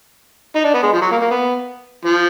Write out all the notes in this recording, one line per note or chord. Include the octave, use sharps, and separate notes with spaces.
D#4
D4
B3
G#3
F3
F#3
A#3
A#3
B3
F3